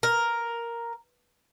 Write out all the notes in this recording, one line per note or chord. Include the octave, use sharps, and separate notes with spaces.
A#4